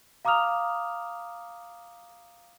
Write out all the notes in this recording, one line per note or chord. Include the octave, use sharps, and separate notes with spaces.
F5 A#5 D6 D#6 F6 F7